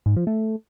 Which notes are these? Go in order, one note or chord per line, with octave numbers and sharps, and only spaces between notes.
G#2
F3
A3